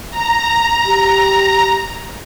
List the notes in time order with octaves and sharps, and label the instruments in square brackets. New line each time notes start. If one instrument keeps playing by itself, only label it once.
[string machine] A#5
[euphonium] G4